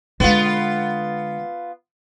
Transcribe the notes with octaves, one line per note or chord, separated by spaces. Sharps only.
D3 G#3 B3 F4